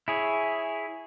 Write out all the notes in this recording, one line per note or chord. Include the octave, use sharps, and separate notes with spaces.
E4 G#4 C#5